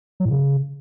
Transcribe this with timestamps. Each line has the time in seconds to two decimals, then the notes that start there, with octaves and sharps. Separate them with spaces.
0.20 F#3
0.25 A2
0.30 C#3